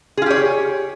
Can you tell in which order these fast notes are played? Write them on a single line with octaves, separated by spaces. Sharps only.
G#4 F4 G4 C#5